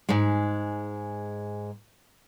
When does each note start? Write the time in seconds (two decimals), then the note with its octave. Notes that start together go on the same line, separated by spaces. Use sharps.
0.09 G#2 G#3